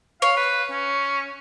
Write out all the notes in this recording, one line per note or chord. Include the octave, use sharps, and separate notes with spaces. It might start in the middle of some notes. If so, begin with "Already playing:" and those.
C#5 F5
B4
C#4